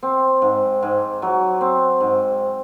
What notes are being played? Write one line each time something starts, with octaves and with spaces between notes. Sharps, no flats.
C4
G#2
G#2
F#3
C4
G#2